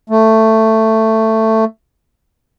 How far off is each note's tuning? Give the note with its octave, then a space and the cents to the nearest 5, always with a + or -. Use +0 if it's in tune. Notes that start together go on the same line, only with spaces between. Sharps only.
A3 +10